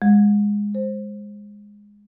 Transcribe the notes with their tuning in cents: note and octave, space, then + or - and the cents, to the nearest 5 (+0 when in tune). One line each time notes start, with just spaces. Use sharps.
G#3 -10
C5 +10